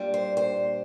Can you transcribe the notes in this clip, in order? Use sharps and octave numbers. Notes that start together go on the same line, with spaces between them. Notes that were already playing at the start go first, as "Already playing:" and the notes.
Already playing: A#2 G3 D4
C5
C5